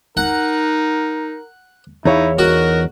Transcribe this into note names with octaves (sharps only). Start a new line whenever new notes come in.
D#4 A#4 F#5
E2 D#4 E4 C#5 F5
D#4 F#4 A#4